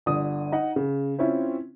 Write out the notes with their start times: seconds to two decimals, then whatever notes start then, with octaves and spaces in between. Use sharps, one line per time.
0.06 G1 D3 D#6
0.52 D#4 D#5 F#5
0.76 C#3
1.19 C4 C#4 E4 F4